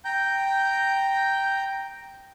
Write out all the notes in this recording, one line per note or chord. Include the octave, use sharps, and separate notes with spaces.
G5 A#5 G6